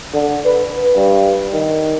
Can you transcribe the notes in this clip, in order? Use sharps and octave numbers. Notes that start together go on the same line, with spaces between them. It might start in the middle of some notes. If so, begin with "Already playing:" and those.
D3
B4
G2
D#3